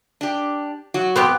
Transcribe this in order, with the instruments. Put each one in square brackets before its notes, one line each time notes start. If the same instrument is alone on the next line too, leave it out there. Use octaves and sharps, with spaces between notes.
[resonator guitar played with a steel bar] D4 G4
F#3 F#4
[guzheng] B3 C4 G4